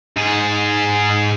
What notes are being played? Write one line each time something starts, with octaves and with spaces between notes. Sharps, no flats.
G#2 G#4